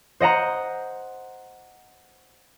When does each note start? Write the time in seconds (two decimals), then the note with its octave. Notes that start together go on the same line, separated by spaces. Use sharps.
0.20 C5 D#5 F#5 A#5